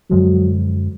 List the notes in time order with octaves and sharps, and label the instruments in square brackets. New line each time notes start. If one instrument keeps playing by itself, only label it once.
[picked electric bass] F#2 D3 F3 G#3 [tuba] F#3